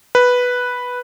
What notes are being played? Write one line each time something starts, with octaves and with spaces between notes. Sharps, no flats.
B4